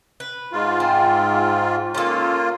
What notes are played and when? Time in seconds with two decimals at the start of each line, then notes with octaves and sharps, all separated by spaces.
0.20 B4
0.52 G#2 F4
0.80 C4
1.94 A#3 C#4 F4 A4